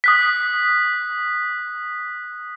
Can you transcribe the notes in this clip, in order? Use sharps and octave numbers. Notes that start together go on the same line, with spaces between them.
D#6 F#6 B6